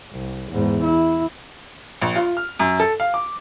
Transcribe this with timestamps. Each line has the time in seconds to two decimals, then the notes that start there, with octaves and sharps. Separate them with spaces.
0.11 C2
0.51 E2 G#2
0.84 E4
2.02 A#1
2.16 F4
2.37 F6
2.59 F#2
2.80 A4
3.00 F5
3.14 D6